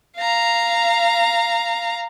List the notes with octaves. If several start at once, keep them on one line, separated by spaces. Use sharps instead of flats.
F5 A#5